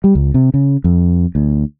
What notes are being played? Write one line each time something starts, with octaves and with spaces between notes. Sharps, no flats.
G3
C#2
C3
C#3
F2
D2